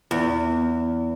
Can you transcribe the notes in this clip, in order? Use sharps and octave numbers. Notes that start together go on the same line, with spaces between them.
E2